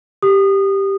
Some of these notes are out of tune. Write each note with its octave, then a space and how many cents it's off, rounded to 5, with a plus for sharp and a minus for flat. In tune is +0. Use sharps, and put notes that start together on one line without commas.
G4 +0 D#6 -25